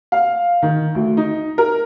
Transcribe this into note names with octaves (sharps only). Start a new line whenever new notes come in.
F5
D#3
D2
D#4
A#4